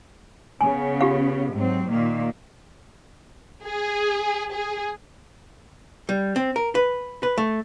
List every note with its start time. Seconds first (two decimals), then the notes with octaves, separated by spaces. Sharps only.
0.61 C#3 B3 G#5
1.01 F4 G4 F5
1.54 G#2 F#3 C4
1.89 A#2 D#3 A#3
3.65 G#4
4.53 G#4
6.09 G3
6.36 C4
6.56 A#4
6.75 B4
7.23 B4
7.38 A3